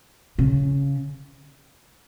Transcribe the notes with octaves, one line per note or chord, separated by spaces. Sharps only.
C#3